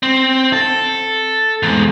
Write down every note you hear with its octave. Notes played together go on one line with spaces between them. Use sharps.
C4
A4
E2 G#2